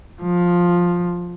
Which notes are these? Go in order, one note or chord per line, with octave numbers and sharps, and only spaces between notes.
F3